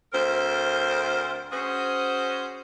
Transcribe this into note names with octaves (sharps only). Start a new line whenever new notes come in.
D2 C4 A#4 C5
C#4 F#4 G#4 C5